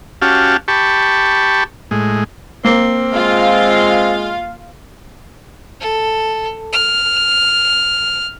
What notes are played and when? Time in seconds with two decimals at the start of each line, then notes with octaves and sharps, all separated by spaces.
0.22 C#4 F#4 G4 F5 A5
0.68 G4 A5 B5 C#6
1.91 A2 G#3
2.65 A#3 C4
3.13 G#3 F4 F5
5.81 A4
6.73 F6